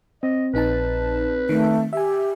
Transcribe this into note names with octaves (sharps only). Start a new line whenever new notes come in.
C4 D#5
A#1 D#4 B4 A5
D#3 A3
G4 E5 G#5